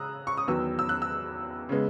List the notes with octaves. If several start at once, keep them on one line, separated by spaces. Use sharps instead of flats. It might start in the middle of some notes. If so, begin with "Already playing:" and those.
Already playing: C#3 A#5 D#6 E6 F#6
C#6
D#6
E2 D#3 F#3 B3 E6
E6
F#6
E6
C#3 G#3 B3